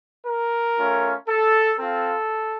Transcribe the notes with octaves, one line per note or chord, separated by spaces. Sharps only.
A#4
A3 C#4 F4
A4
C4 F4 A4